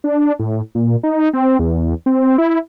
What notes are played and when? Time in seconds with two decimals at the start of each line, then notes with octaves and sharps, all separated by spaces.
0.04 D4
0.39 A2
0.75 A#2
1.03 D#4
1.33 C4
1.59 E2
2.06 C4
2.38 E4